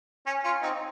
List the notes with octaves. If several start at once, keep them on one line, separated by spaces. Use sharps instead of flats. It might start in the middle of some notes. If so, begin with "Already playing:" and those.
C#4
C#4 F4
C4 D#4